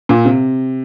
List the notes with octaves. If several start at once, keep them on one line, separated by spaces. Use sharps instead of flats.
A#2
C3